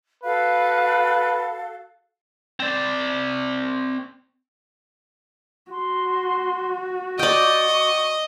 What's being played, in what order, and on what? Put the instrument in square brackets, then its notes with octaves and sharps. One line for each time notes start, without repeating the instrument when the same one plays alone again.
[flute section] F#4 A4 F5 [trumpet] B4
[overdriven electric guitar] C4 D5
[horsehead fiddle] F#4 [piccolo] C6
[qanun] D5 G5 [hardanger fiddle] D#5 [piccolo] C#6